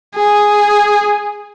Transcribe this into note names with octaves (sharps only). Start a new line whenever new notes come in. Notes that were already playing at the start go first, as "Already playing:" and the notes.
G#4